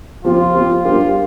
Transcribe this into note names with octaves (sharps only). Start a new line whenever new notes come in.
F3 C4 F4 G4
F3 C4 G4
G3 D4 F4 G4 A#4